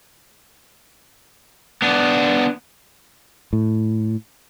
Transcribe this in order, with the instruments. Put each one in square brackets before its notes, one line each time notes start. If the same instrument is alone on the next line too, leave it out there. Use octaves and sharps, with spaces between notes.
[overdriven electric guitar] B3 D4
[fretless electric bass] A2